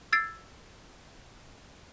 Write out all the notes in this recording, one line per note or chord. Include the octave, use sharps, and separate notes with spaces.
E6 G#6 A6 C7 D7